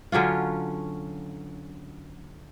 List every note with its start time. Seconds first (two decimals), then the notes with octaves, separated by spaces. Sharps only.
0.12 D3 F#3 C#4 F4